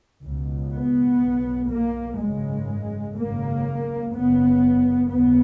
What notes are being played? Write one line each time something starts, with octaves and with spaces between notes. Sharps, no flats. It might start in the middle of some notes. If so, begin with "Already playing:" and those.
C#2 B2
B3
B1 B2
A#3
G#1 F#2 C#3 G#3
G#1 F#2 C#3 A#3
F#1 F#2 C#3 B3
D#2 C#3 B3